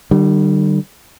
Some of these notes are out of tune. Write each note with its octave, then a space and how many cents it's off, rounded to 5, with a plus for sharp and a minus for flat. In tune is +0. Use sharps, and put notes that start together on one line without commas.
D3 +45 G3 -20